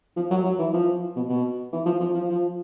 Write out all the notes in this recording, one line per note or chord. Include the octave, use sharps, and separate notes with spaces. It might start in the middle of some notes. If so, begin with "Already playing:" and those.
F3
F#3
F#3
E3
F3
B2
B2
E3
F3
F3
F3
F3